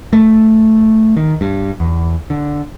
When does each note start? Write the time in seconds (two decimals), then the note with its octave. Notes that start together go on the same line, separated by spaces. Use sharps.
0.13 A3
1.17 D#3
1.41 G2
1.80 E2
2.30 D3